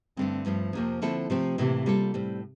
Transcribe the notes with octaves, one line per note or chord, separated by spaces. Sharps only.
G2 D3 A3 C4
G2 F3 A3
F2 C3 F3 A#3 C4
D3 F3 C4 E4 A4
C3 F3 A3 C4
A2 C3 E3 A#3
G3 A#3 F4 A4
A2 G3 C4